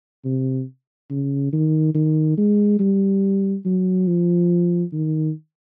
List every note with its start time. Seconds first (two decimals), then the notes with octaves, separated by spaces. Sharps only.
0.25 C3
1.10 C#3
1.53 D#3
1.94 D#3
2.37 G#3
2.80 G3
3.65 F#3
4.07 F3
4.92 D#3